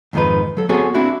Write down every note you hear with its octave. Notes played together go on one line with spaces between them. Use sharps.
F2 G#2 D#3 F3 D#4 B4
F#3 A4
B3 C4 F#4 G#4 A4 C#5
C4 D4 E4 F#4